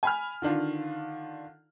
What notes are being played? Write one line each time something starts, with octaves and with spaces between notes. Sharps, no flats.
G#5 B5 F6
D3 D#3 D4 F4